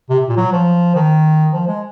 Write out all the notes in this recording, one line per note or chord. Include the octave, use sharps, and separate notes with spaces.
C3
A#2
F#3
F3
D#3
F3
G#3